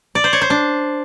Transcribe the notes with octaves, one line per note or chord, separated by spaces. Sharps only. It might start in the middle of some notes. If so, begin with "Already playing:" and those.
D5
C5
C#5
C5
D4